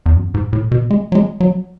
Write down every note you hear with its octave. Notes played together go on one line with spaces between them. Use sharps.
E2
F#2
G#2
A2
B2
G#3
F#3
G#3
F#3